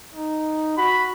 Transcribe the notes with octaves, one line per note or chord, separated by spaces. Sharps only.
D#4
F#4 B5